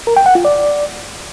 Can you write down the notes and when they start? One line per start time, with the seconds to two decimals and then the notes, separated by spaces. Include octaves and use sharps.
0.07 A#4
0.16 G5
0.26 F#5
0.35 F4
0.45 D5